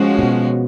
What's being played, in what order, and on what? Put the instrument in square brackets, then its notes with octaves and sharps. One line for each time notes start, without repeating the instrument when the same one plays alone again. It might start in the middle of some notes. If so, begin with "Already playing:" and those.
Already playing: [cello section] F3 G#3 C#4 F#4
[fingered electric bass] A#2
B2